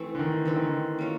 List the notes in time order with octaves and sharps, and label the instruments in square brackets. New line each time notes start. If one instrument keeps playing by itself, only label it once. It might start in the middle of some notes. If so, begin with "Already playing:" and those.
Already playing: [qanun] E3 A3 C4
[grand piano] D3
D#3
[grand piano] D3 [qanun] E3 A3 C4
[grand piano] D#3
D3
[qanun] A#3 C#4 F#4